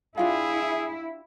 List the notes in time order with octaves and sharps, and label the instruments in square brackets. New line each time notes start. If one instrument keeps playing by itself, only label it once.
[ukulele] D4 F4 G4 [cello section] E4 [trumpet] G#4 [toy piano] F5